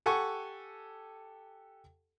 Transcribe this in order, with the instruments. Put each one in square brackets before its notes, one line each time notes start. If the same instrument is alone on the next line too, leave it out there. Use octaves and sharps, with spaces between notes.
[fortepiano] G4 A4 F#5 G#5 C#6